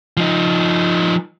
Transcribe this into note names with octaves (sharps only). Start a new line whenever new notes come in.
F3 D#4